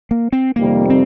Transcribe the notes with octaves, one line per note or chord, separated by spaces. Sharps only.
A#3
C4
F2 C3 D#3 G3 A#3
C4